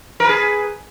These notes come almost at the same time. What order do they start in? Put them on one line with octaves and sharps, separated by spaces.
A#4 B4 G#4